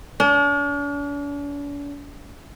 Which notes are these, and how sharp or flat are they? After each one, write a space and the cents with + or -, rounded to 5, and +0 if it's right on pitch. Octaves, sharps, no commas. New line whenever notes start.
D4 -45